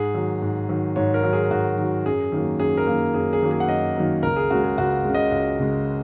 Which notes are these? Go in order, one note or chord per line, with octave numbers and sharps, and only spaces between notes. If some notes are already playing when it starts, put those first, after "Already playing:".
Already playing: G#2 G#4
D#3 F#3
G#2
D#3 F#3
G#2 C#5
A#4
D#3 F#3
G#4
G#2 F#4
D#3 F#3
F#2 G#4
D#3 F#3 A#3
F#2 G#4
A#4
D#3 F#3 A#3
F#2 G#4
G#4
D#3 F#3 A#3
G#4
F#5
F#2 D#5
D#3 F#3 A#3
C#2 A#4
G#4
C#3 G#3 F#4
G#4
C#2 F#4
C#3 G#3
D#5
C#2
C#3 G#3